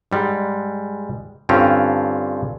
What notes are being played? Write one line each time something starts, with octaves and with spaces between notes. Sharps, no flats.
G#2 G3 G#3
G2 D3 C4 C#4 F4